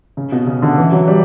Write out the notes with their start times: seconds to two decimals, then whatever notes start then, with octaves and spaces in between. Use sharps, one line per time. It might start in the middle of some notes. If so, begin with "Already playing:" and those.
0.17 C#3
0.32 B2
0.47 C#3
0.62 D3
0.77 E3
0.92 F#3
1.08 G3